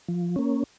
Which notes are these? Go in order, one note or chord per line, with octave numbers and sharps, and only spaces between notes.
F3
A#3 C#4